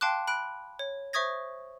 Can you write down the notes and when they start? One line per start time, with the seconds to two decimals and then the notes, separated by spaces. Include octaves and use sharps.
0.01 F5 G5 A5 C6 D6 F#6
0.27 B5 F#6 D7
0.79 C#5
1.13 C5 E5 C#6 D#6 G#6 A#6